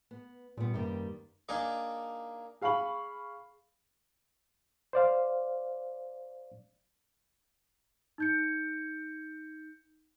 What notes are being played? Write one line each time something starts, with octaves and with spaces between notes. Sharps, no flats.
B3
A#2 G3 B3
F#2 D#3 G3 A#3
A#3 D4 D#4 G#4 D5
G#4 F5 B5 C#6 F#7
C5 D5 F5
D#4 G6 C#7